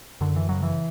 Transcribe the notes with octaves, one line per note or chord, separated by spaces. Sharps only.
F#2 D3
E3
C#3 F#3
E3